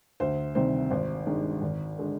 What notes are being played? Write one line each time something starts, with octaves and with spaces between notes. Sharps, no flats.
D2 C5
C3 D#3 G3 C5
G#1 C5
G2 D#3 G#3
G#1
D3 G#3